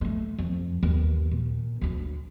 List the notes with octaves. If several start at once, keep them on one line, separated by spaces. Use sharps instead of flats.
G#3 A3
F2
G1 D#2
A#2
D2 D4